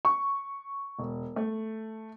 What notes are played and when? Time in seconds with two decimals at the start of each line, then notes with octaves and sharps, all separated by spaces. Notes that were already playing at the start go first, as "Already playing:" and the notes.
0.05 C#6
0.99 E1
1.36 A3